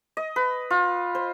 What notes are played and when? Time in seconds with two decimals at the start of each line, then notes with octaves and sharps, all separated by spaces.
0.17 D#5
0.36 B4
0.70 F4
1.15 C5